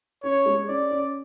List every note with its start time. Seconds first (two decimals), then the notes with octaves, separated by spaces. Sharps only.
0.23 C#4 C#5
0.46 G#3
0.68 C#4 D5
0.91 C#4